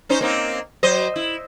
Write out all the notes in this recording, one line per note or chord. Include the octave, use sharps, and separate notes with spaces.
C#4 D#4 C5
A#3 C4 D#4
F#3 C5 D#5
E4